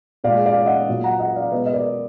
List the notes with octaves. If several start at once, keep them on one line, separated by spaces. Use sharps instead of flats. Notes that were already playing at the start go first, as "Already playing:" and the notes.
A#2 G#3 D5 F5
D5 F5
D#5 F#5
A#2 F#3
F#5 A#5
D#5 F#5
D5 F5
B2 G#3 B4 D#5
D#5
A#4 D5